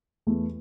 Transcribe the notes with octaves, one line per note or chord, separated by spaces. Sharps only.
E2 E3 A3